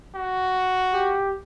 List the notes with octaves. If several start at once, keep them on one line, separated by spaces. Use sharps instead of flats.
F#4
G4